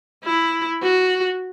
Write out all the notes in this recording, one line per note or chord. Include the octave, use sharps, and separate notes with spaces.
E4
F#4